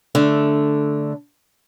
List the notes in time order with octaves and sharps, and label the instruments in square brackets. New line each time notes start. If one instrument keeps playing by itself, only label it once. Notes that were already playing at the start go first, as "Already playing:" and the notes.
[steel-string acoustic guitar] D3 A3 D4